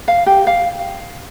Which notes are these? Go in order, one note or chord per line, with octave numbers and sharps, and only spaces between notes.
F5
G4
F5